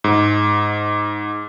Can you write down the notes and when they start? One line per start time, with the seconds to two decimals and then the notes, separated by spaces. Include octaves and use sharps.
0.04 G#2